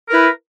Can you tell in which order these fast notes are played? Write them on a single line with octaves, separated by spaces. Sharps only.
A#4 B4 E4